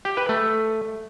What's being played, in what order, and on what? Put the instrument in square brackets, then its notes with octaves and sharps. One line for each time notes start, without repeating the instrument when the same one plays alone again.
[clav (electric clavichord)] G4
B4
A3